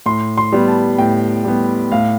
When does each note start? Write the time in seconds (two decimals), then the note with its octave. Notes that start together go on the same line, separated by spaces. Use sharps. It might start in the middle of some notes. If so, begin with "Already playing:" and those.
0.06 A2 C6
0.38 C6
0.53 G3 B3
0.68 A5
0.98 A2 G5
1.44 G3 B3
1.92 A2 F5